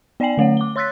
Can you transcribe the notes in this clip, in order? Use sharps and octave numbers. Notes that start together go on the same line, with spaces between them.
B3 D5 G5 G#5 C7 F#7
D3 A3 C#5 F#5
D6 G7
C#5 C6 E6 F#6 A6 B6